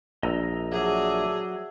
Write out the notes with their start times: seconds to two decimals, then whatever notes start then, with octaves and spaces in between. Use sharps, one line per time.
0.23 A#1 D#5 A#5 E6
0.72 F#3 G#4 A4 D5 E5